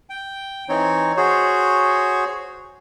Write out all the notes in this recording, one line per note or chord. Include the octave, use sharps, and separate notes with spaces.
G5
E3 C4 D#4 C#5
F#4 G#4 C5 C#5